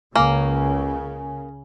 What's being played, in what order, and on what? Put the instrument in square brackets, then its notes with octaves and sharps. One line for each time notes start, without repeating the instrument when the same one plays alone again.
[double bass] C#2 [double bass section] C#3 [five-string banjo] A#3 [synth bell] G#5